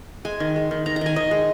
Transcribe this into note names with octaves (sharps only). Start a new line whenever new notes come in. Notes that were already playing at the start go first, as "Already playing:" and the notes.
G#3 G#5
D#3
G#3
D#3
D#3 A#5
A#5
D#3 G#5
D#3 D#5
G#3